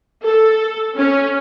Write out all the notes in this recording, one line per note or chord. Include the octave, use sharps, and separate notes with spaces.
A4
C#4